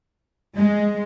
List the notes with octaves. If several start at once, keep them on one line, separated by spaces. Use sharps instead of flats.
G#3